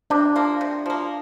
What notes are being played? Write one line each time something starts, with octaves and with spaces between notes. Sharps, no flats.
C3 D4
F3 A#3
C3
F3 A#3